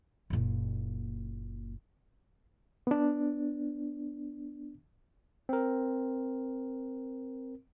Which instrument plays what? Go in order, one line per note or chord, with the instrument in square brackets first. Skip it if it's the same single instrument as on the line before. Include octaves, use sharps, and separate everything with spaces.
[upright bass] F#1 A#2
[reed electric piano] B3 D4
[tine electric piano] C4 A#4